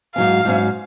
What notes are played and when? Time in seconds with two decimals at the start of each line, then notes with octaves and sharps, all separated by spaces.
0.15 G#2 F#3 C#4 F5
0.45 G#2 F#3 C#4